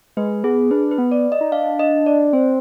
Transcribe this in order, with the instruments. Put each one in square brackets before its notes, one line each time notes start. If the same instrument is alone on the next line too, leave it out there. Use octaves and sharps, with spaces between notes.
[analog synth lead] G#3 [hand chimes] B4
[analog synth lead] B3 [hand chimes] G#4
[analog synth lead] D4 [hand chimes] B4
[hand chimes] B4
[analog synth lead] B3
[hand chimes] D5
D#5
[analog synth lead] D#4
[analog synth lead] D4 [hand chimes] F5
[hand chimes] D#5
D5
[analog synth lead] C4 [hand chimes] C5